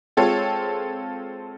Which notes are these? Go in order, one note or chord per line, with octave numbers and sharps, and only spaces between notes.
G#3 C4 F4 A4 C#5